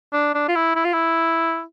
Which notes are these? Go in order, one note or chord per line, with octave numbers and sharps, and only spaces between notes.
D4
D4
F4
E4
E4
F4
E4